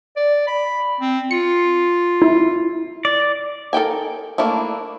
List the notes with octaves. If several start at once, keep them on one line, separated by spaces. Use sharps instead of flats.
D5
B5
C4
F4 C#7
E4
D5
A4 A#4 G5 G#5
A3 A#3 D4 E4